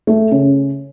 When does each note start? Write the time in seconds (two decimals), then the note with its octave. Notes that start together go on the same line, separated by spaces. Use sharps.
0.07 A3
0.31 C#3